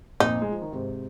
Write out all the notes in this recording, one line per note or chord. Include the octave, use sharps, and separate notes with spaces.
F2 A#2 D#4
G#3
F3
D#3
G#2 C3